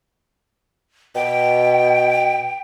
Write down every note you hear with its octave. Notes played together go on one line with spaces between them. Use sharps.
B2 G5